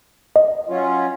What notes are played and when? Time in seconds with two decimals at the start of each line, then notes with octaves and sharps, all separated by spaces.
0.36 D#5
0.69 F#3 C#4 F4